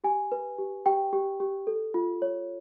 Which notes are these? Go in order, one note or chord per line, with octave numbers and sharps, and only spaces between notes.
G4 G#5
B4
G4
G4 G5
G4
G4
A4
F4
C#5